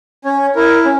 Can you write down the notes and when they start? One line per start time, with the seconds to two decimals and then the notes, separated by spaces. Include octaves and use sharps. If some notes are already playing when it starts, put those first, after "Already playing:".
0.25 C#4 C#5
0.55 E4 A#4
0.85 C#4